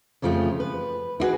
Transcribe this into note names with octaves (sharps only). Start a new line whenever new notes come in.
F2 C#3 F3 A3 F4 G4
B4
E4 F#4 G#4 B4